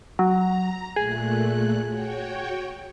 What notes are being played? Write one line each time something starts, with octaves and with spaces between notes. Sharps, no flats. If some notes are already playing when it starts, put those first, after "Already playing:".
F#3 A#5
A#2 A3 G#4 F#6
F#4 C#5 G5